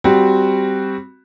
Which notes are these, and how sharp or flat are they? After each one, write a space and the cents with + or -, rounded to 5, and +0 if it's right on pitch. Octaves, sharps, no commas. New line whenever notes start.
G3 +0 C4 +0 F#4 +0